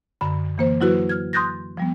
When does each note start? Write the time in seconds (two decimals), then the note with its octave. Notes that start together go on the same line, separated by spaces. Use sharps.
0.21 F#2 D3 B5
0.58 E3 A#3 C5
0.81 F#3 E4 F#4 B4
1.09 F6 G#6
1.33 C6 D#6 F#6 G6 A6 A#6
1.77 F3 G3 B3